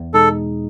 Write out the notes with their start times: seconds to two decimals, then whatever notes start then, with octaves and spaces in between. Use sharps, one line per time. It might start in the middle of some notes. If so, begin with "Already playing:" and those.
Already playing: E2
0.14 B2 G#3 D#4 G#4 A4